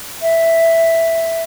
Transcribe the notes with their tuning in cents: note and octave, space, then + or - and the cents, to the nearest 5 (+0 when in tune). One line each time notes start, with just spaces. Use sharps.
E5 +0